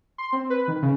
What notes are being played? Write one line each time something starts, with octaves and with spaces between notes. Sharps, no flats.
C6
C4
B4
D#3
C#3